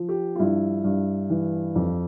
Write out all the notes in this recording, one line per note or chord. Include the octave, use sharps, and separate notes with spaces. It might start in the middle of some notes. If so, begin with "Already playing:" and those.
Already playing: F3
G4
F4
G2 E4
G2
E3
F2